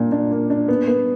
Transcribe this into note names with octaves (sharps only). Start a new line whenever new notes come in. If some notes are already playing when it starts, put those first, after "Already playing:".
Already playing: A#2 A#3 D4
D4
A#3
D4
B3
B3